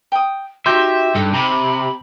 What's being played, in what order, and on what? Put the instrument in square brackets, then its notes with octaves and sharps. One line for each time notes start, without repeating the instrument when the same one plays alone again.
[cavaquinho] G5 D#6
[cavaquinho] D#4 G4 [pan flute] F#4 [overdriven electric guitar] E5 [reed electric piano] C6 G6
[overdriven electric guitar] G2 [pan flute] A4
[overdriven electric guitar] C3 [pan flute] B5